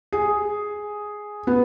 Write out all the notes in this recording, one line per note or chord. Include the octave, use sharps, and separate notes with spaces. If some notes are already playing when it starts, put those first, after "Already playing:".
G#4
B3